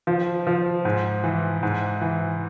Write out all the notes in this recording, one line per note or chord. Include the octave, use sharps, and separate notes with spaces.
F3
F3
G#2
E3
G#2
E3